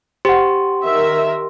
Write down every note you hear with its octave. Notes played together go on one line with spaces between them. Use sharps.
G4 C5 F#5 C6
D#3 A#4 E5